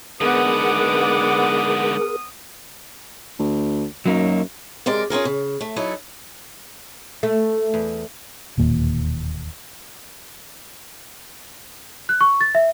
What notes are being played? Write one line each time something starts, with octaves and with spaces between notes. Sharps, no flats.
G#2 D3 B3 G#4 A#4 F#5 D6 D#6
D2
F#2 F#3 A#3 D#4
C3 G#3 A#4 D5
C#4 F4 G#4 A#4
C#3
A3
F#3 D#4 E4 A4
A3
E2
E1 D#2 A#2
F#6
C#6
A6
E5